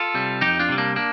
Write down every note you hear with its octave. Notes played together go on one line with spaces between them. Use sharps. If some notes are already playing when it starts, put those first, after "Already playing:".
Already playing: F4 A4
C3 G3
F2 D#4 G4
D4 F4
C3 G3
A#3 D4
A#3 D4